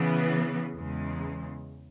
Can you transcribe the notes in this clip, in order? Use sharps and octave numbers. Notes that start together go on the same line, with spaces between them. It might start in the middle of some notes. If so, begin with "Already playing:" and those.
Already playing: C#3 E3 B3
E2 C#3 G#3